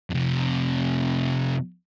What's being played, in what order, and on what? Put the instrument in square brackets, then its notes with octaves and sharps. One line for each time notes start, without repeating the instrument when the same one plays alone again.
[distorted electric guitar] F2 C3